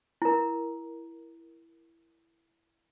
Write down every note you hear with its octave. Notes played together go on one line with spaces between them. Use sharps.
E4 A#4